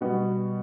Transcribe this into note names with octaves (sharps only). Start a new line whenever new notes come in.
B2 G3 B3 F#4